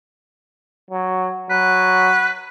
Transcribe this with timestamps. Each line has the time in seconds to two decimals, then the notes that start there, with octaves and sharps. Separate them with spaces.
0.91 F#3
1.50 F#3 B4